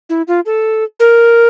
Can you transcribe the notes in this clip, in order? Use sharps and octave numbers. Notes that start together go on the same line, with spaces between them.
E4
F4
A4
A#4